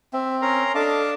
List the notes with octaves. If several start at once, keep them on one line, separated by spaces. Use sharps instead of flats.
C4 E5
C#4 A#4 A#5 C6
D4 A4 D#5 F5 A5 D6